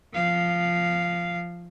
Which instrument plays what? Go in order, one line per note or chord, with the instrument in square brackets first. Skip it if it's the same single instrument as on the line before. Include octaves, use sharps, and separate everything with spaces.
[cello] F3 F5